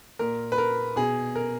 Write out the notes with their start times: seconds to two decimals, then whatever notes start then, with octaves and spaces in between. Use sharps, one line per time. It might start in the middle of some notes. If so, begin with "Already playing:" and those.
0.19 A#2 A#4
0.52 B4
0.58 A#4
0.96 B2 G#4
1.36 A#4